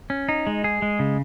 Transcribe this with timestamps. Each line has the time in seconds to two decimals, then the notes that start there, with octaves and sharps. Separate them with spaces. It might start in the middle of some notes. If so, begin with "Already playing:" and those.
0.10 C#4
0.29 D#4
0.47 G#3
0.64 G#4
0.82 G#3
0.99 C#3